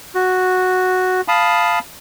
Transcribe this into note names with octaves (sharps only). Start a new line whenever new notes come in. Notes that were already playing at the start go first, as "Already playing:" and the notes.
F#4
F5 A5 B5 D#6